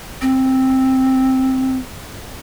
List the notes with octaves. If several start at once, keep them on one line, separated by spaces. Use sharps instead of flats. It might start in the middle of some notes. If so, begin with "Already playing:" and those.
C4